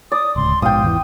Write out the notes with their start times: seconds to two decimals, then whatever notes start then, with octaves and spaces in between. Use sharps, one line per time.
0.12 D5 D#6
0.36 D1 C#2 C6
0.62 A#1 G#2 B2 F5 G5 D#6
0.83 G#1 E2 E3